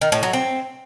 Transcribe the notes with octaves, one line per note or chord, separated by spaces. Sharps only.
D#3
A2
F#3
C4